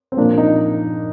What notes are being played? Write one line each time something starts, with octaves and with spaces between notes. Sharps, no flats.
C4
A#2 F3 A#3 D4
D#4